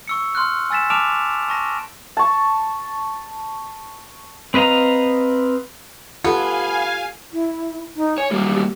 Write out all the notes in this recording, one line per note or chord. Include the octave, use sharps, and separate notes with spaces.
C#6 E6 C#7
C6 F6 F#6
G#5 E6 A6 B6 E7
A5 D6 F6 D7 E7 F7
A5 C#6 A#6
A5 C#6
C4 B4 D#5 F5 A#5
B3 F4 G4 A4 F5 G#5
E4
D#4
C#5 G#5
F#3 G3 A#3 G4
G4